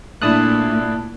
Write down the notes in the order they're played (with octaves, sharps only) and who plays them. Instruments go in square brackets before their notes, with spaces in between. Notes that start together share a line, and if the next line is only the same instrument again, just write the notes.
[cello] A#2 [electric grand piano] A3 D4 E4 [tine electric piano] A5 D#6 F#6